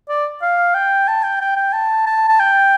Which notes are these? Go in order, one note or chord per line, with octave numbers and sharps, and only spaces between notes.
D5
F5
G5
A5
G5
G5
G5
A5
A5
A5
G5